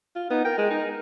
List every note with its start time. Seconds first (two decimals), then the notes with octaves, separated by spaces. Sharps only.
0.16 F4
0.30 B3 D#4
0.45 A#4 G5
0.58 G#3
0.70 D#4